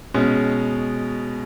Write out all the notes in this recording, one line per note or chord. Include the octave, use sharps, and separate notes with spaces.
B2 G#3 C#4